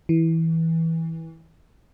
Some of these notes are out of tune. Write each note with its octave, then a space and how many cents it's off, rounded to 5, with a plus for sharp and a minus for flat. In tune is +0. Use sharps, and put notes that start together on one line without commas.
E3 -15